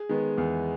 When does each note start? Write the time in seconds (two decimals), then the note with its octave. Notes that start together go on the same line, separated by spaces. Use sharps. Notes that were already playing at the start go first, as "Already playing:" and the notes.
Already playing: G#4
0.09 D#3 G#3 B3
0.38 E2